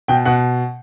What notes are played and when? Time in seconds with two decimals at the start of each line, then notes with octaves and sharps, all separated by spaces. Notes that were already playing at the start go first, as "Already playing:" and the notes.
0.08 B2 G5
0.25 B2 F#5